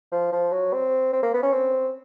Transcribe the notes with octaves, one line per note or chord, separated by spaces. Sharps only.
F3
F3
F#3
C4
C4
A#3
B3
C#4
C4